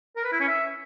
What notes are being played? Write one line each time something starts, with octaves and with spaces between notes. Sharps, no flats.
A#4
B4
E4
C#4
E5